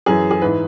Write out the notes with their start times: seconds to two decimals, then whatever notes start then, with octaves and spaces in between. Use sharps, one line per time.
0.06 F#2 E3 G#4
0.31 G#4
0.42 G#2 E3 B4